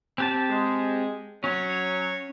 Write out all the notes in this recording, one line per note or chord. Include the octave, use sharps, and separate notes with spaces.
C4 G4 A5
G#3
F#3 C#4 C#5